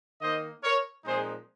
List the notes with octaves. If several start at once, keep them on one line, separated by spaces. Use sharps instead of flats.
D#3 A#3 D#4 C5 D#5
A#4 C#5
A#2 F3 G#3 C4 D#4 G#4 C5